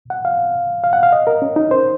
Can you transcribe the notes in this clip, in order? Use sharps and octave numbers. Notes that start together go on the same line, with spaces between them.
F#5
F5
F5
F#5
F5
D#5
A#4
C#4
D#4
C5